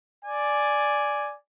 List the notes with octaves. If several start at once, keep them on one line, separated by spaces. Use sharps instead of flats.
D5 G#5